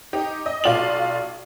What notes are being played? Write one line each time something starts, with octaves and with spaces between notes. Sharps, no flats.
D#4 G4
D#5
B1 F4 D5 F#7